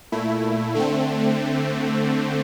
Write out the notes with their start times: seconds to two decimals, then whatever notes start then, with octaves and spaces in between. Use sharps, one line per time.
0.12 A#2 A3 E4
0.75 D3 A3 C4